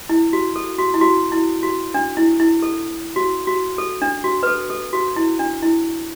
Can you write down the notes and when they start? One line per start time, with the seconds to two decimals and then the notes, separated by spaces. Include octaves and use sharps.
0.09 E4
0.33 F#4
0.56 A4
0.78 F#4
0.94 E4
1.01 F#4
1.32 E4
1.63 F#4
1.94 D4
2.17 E4
2.40 E4
2.62 A4
3.16 F#4
3.47 F#4
3.78 A4
4.02 D4
4.24 F#4
4.43 B4
4.47 A4
4.70 A4
4.93 F#4
5.16 E4
5.39 D4
5.62 E4